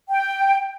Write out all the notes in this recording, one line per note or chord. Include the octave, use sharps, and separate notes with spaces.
G5